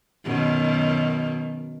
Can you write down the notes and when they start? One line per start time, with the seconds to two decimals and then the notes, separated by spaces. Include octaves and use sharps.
0.25 F#2 B2 D#3